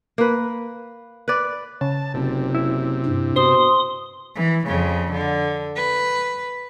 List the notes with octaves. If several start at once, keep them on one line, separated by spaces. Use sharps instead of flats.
A#3 B4
B4 D5
C#3 A5
F#1 C3
E4
G2
B2 C5 C6 D#6
E3
F2 C#3
D3
B4